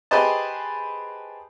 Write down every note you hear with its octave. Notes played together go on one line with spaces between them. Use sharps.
G4 G#4 B4 C5 D#5 A5